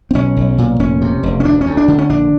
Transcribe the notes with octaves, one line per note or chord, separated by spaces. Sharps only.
C4
B1 C#4
B1
A#2
F1 C#4
C3
F1
C#4
D2 D4
C#4
D2
D4
D3
C#4
A#1 D4